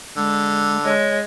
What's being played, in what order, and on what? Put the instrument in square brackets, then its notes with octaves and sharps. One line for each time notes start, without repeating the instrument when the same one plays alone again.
[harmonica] D3 [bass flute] G#3
[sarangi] G#3 [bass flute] C#5